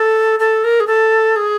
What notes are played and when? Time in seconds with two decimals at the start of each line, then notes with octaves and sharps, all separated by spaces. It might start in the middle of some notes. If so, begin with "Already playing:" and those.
Already playing: A4
0.40 A4
0.64 A#4
0.80 G#4
0.87 A4
1.36 G#4